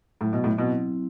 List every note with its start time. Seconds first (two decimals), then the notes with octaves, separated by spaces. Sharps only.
0.21 A2 F#3
0.33 B2
0.44 A2
0.57 B2 C4 E4